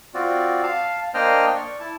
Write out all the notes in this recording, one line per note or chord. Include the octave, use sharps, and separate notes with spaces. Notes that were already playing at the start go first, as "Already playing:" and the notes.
C4 F4 F#4 D5
F5 A5
A#3 D4 C5 D#5 G5 F6
D5 C#6
E4 A5